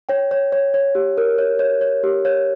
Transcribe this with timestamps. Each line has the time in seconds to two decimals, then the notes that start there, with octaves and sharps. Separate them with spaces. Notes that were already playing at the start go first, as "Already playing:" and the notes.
0.09 C#5 G5
0.31 C#5
0.52 C#5
0.74 C#5
0.95 G4
1.17 A#4
1.38 C#5
1.59 C#5
1.81 C#5
2.04 G4
2.25 C#5